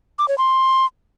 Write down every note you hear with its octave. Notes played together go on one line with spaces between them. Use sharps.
D6
C#5
C6